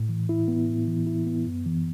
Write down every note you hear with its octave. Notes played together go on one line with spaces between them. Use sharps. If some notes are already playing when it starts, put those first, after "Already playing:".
Already playing: A2
E3
E4
B3
A2
E3
E4
B3
F#2
E3